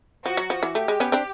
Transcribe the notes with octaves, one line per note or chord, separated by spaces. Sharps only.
F3 F#4
F#3
F3
E3
A3 G4
G#3
B3 C#4
C4 D4